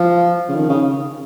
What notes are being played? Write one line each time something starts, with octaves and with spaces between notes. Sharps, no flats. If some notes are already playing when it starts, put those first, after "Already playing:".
Already playing: F3
C#3
D#3
C#3